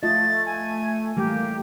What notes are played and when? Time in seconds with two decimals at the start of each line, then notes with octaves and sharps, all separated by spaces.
0.03 A3 F4 D#5 A6
0.46 G#5
1.17 E3 G3 A3 A#3 G4